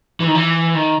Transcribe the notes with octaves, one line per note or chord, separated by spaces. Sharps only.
E3
D#3
E3
D#3